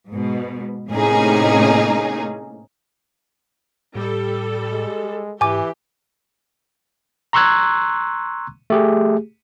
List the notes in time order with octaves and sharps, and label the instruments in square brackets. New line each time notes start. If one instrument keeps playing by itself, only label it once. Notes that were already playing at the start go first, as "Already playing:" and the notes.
[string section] G#2 B2
A2 C3 A#3 C#4 D#4 G#4
[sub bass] A2 [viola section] G3 A4
[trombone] G#3
[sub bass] G#2 [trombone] E3 [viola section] G4 [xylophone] G#5 D6
[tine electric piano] A#5 C6 C#6 E6 F#6 G#6
A3 G4 G#4